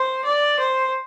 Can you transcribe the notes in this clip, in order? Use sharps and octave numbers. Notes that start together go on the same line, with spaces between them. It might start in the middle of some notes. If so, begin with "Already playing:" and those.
Already playing: C5
D5
C5